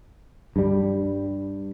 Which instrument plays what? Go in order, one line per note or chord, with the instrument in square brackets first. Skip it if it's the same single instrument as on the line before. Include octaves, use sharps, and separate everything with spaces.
[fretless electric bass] G2 G3